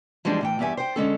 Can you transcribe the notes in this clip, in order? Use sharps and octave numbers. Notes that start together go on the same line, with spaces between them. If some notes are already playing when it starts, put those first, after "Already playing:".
E3 F3 G3 G#3 D4
A2 E3 G5
E2 G2 G4 E5 G#5
C5 G5
D3 G#3 C#4 A4